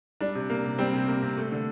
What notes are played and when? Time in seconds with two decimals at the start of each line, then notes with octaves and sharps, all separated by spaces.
0.20 G3 D4
0.35 C3
0.50 A#3
0.64 C3
0.78 G3 C4
0.93 C3
1.08 A#3
1.23 C3
1.37 A3
1.52 D3